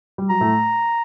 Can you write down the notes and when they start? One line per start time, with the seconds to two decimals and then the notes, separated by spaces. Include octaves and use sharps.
0.18 G3
0.30 F#3 A#5
0.41 A2 A3